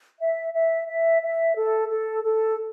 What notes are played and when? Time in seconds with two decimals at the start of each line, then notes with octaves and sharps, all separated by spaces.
0.19 E5
0.54 E5
0.88 E5
1.22 E5
1.55 A4
1.89 A4
2.24 A4